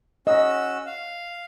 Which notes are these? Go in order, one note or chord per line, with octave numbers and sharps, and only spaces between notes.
C#4 F#4 D#5 E6
F5